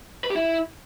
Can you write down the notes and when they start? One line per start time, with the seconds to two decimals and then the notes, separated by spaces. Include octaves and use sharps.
0.24 B4
0.30 G4
0.36 E4